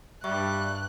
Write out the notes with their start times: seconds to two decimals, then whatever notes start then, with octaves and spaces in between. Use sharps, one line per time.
0.24 G2 G3 E5 C#6 F#6